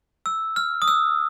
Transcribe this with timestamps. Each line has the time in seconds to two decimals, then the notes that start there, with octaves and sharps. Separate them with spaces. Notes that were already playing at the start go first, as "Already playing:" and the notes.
0.26 E6
0.56 F6
0.82 D#6
0.88 E6